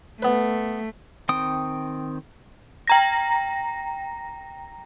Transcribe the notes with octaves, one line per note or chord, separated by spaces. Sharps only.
A3 B3 B4
D#3 C4 G5 D#6
G5 A#5 A#6